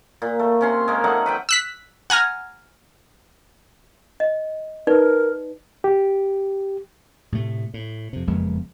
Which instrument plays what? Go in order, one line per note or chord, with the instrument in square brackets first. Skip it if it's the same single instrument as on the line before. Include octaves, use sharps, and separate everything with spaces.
[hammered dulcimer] A#2
A3
C3 C#4 C6
G#3 A#3
F#3 A3 D#4 F#5
B4 F#5 G5
[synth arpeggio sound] E6 F#6 B6
F#5 G#5 A#5 F6
[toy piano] D#5
[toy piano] D#4 B4 D5 [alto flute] A#4
[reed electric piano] G4
[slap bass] A2 C3 A3
A2
F2 C3
F#1 F2 G#3 B3